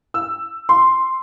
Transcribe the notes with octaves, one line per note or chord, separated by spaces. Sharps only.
E6
C6